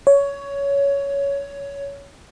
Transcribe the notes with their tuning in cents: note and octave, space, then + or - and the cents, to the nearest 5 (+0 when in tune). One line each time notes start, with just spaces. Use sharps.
C#5 +15